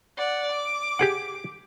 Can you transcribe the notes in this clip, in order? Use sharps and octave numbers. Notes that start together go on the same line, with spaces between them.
D5 F#5
D6
G4 G#4 F#5